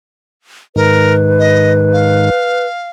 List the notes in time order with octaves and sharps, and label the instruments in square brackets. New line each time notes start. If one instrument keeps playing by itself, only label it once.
[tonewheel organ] G#2 D#3 [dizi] A#4 [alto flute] B4
[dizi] D#5
F5